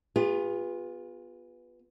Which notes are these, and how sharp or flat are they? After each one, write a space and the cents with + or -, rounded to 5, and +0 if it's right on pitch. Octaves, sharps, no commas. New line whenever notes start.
B3 +0 F4 +20 G#4 -40